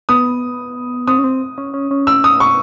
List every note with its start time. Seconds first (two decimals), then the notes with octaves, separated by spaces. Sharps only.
0.09 B3 D#6
1.07 C4 D#6
1.19 C#4
1.24 C4
1.58 C#4
1.74 C#4
1.91 C#4
2.07 E6
2.24 D#6
2.40 C#6